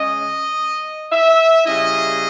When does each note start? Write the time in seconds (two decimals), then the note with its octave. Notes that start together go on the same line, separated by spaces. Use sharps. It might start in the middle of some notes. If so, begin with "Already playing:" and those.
Already playing: C#3 G#3 C#4 D#5
1.12 E5
1.65 C#3 G3 C#4 E4 D#5